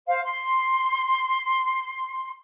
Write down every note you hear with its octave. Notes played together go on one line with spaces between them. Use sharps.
C5 F5
C6